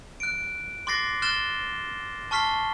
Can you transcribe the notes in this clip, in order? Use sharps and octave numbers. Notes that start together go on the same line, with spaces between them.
F#6 D7
C6 D6 F#6 A6 A#6 C7
C6 F6 F#6 A6 E7 G7
A5 C#6 F6 B6 C7 G7